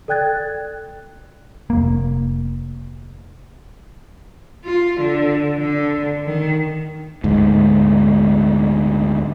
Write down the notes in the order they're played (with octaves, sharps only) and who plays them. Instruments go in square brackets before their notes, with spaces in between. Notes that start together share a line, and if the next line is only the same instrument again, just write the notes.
[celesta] A4 D5 G5 F#6 G#6 A6
[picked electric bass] F1 A#3
[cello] F4
D3
D3
D#3
[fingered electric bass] D2 G#2